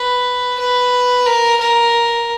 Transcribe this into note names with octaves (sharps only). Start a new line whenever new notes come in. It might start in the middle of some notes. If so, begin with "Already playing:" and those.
Already playing: B4
B4
A#4
A#4